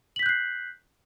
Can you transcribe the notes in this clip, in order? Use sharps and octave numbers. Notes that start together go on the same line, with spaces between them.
F#6 G6 B6 C7 F#7